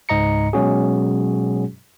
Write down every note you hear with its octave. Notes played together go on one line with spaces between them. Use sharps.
C#2 G#2 D#5 A#5 C#7
B2 F#3 G#3 C#4 F#4 G#4